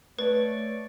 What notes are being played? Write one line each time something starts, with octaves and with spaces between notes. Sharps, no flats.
A3 B4 C#5 D5